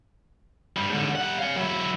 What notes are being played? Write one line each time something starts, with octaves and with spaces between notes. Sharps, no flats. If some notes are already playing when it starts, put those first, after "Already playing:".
G2 G3
G#2 D3
G3 F#5
F5 G#5
F#3 E4